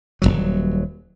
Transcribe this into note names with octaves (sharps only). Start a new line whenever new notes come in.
D#1 C2 F#3